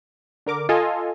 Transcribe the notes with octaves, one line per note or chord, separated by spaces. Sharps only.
D3 A#4 D6
F4 A4 D#5 G#5